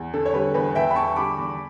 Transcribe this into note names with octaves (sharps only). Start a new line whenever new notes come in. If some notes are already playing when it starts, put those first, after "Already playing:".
Already playing: E2
D3 A4
C#5
G3 B4
E2 B4
E2 E5 G5
B5
D3 A5 C#6
G3 B5 D6
E2